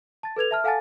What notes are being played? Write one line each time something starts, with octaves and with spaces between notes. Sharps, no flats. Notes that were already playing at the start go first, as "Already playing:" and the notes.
A5 A6
A4 B4 G#6 F7
E5 A5 F6
A4 F5 F#5 G#5 A5 A6